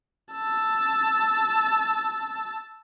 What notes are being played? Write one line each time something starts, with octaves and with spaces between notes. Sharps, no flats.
A5 E6